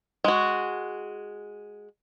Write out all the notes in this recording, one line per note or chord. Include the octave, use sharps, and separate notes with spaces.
G#3 F#4